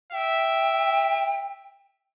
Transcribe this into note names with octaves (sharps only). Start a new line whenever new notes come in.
E5 G5